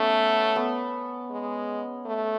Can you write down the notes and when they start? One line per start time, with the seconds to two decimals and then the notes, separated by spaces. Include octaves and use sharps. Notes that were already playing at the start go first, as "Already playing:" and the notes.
Already playing: A3 B3 C#4
0.56 B3
1.31 G#3
2.06 A3